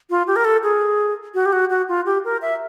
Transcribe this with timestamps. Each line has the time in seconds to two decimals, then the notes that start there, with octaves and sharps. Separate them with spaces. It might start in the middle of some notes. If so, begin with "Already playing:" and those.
0.10 F4
0.27 G4
0.36 A#4
0.45 A4
0.63 G#4
1.34 F#4
1.46 G4
1.53 F#4
1.70 F#4
1.88 F4
2.06 G4
2.24 A#4
2.42 E5